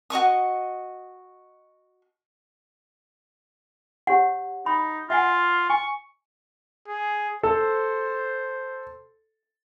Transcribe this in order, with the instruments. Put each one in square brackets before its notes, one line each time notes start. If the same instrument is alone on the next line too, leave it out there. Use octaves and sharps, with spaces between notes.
[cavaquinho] F#4 D#5 C#6 D#6
[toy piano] G4 C#5 F#5
[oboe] D#4 [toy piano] B5
[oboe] F4 [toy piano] E5 F#5 G#5
[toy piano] G#5 [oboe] C#6
[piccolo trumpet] G#4
[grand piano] A4 [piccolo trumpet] C5